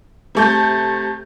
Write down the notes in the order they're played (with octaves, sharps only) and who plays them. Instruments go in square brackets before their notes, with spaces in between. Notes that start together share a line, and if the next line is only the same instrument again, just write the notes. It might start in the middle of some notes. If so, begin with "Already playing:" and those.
[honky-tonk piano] C3 A3 G6